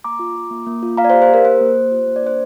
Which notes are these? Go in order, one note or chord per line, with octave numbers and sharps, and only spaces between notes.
A#3 A#5 D6
F4
F4
A#3
A#3
F4
A#3 F5 A#5
D5
G4 C5 F5
C5
G4
A#4
A#3 C5
A#3
G4
F4
A#3
D5
D4 C5